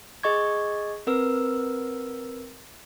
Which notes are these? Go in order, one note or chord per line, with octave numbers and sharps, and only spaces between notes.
G#4 D#5 C#6 G#6
C4 A#4 B4 E6